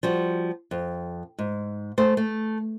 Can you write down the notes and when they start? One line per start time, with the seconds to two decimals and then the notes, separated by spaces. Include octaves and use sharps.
0.03 F3 G3 F#4
0.71 F2
1.38 G#2
1.98 A3 C5
2.17 A3